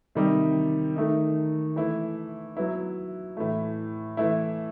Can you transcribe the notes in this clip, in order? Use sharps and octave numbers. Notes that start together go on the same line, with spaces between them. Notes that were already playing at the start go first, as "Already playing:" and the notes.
C3 D#3 G3 D#4
D#3 A3 D#4
E3 A3 E4
F#3 B3 E4
A2 E3 A3
E3 A3 E4